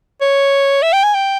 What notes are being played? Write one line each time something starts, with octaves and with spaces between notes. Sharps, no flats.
C#5
E5
G5
G#5
G5